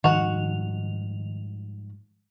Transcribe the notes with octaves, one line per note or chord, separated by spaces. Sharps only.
G#2 D#3 F3 G3 F#4 F#5 F7